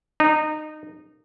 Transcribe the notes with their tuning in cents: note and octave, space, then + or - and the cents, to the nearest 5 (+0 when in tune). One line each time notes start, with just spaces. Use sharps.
D#4 -20